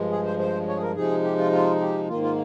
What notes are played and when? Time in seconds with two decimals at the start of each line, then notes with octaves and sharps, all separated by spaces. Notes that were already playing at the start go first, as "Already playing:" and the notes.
Already playing: G2 F3 G#3
0.11 G#4
0.25 C5
0.39 C5
0.68 C#5
0.77 G#4
0.82 A#4
0.95 C3 F3 G#3 D#4 G#4
1.24 G4
1.38 F4
1.53 F4
1.81 G4
2.09 G#2 D#3 A#3 F4
2.23 F4